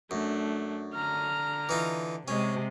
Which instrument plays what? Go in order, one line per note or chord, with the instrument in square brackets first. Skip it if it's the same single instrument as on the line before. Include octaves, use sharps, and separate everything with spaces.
[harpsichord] F#2 [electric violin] A3 D4
[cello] D3 [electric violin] A#5 F6
[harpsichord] E3 D#4 F4
[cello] C3 G#3 [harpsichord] C#4 [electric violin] D#5